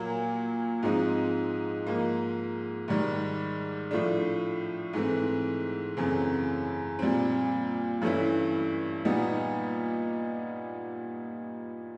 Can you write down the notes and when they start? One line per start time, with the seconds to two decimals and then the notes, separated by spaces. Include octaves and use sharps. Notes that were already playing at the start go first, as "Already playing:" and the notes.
Already playing: A#2 F#3 A#3
0.83 G#2 F3 G#3 C4 D#4
1.86 G#2 F3 A#3
2.88 G#2 D#3 G3
3.91 A2 F3 A3 D4
4.93 G#2 E3 A3 C4
5.97 F#2 C#3 E3 A3 C4
6.99 A#2 G3 C4
8.02 G2 E3 A3 C#4 E4
9.05 A#2 G3 B3 D#4